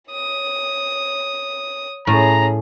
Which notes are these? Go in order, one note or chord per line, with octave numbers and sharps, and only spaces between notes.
C#5 D#6
A2 C#4 G#4 A#5